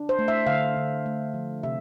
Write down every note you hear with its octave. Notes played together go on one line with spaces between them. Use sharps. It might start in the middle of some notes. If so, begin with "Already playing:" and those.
Already playing: D4
C5
A3
E5
D3 F5
D3
A3
F3
C3 E5